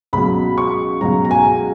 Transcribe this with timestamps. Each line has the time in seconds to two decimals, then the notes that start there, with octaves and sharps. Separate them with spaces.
0.13 C#2 B2 F#3 B5
0.58 C#6
1.01 C#2 B2 F#3 A#5
1.25 A#5
1.31 G#5